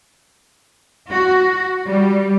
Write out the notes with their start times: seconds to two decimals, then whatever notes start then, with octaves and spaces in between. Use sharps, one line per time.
1.10 F#4
1.88 G3